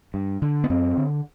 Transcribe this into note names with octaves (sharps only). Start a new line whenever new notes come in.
G2
D3
B3
F#2 C4
D3